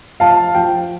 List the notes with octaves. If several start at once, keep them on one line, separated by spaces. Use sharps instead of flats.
F3 F5 A5
F3 G5